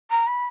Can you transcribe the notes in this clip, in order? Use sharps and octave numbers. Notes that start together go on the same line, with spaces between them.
A#5
B5